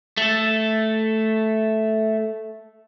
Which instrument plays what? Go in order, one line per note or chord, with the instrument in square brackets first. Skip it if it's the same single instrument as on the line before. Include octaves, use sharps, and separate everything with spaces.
[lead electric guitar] A3 A4